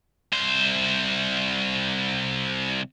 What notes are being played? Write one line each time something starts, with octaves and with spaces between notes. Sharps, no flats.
C2 C5